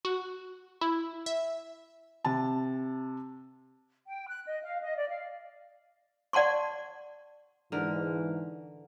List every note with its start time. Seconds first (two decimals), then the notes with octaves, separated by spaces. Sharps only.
0.05 F#4
0.81 E4
1.26 E5
2.25 C3 A5
4.06 G5
4.28 F#6
4.46 D#5
4.63 F5
4.82 D#5
4.97 D5
5.09 F5
6.33 D5 F#5 A5 C6 C#6
7.72 G#2 D3 E3 A#4